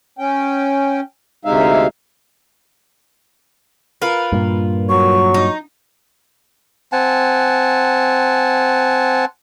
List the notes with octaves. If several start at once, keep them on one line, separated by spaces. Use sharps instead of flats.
C#4 G5
D2 C3 G#3 D#4 E5 F5
F4 A#4 B4
G2 A#2
F#3 C#6
D#4
C4 F#5 G#5 A5